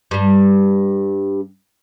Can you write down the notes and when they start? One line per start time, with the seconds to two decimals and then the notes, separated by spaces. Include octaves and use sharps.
0.11 G2 G3